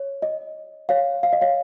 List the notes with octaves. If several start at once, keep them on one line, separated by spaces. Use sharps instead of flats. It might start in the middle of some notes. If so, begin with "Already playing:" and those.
Already playing: C#5
D#5
C#5 F5
F5
D#5
C#5 F5